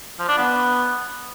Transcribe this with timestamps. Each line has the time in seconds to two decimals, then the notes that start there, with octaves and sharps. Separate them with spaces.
0.19 F3
0.28 D4
0.38 B3